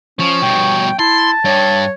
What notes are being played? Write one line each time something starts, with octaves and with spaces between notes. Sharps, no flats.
F3 C#4 C#5
G2 B2 G5
E4 A5 C6
G2 C#5